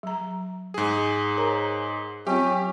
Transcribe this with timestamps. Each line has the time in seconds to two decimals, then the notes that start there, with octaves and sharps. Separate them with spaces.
0.03 F#3 A#5
0.74 G#2 G#4
1.37 A#4 C#5 A#5
2.27 F#3 C4 C#4 F4 G4